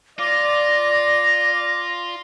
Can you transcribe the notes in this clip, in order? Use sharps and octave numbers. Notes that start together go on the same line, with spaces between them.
F4 D5 D6 A#6